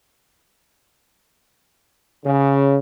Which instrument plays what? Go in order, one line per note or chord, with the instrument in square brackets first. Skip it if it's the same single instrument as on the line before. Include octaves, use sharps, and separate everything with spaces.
[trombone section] C#3